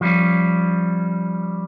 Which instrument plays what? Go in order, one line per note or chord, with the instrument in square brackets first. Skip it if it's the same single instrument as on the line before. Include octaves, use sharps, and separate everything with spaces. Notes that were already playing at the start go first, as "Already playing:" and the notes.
[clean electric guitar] F3 G3 C#4